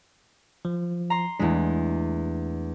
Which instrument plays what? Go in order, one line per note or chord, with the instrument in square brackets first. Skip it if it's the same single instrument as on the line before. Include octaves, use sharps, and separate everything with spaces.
[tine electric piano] F3
[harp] A#5 C6
[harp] E2 G#3 [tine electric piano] A3 D4